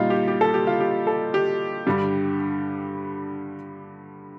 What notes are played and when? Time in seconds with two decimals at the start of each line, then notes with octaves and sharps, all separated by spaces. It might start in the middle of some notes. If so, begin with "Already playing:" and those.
Already playing: A#2 G3 D#4 F4
0.10 G4
0.28 G4
0.41 A4
0.54 G4
0.67 F4
0.80 G4
1.07 A4
1.34 G4
1.87 G2 D3 G3